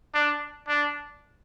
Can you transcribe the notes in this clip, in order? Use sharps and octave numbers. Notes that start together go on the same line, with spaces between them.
D4
D4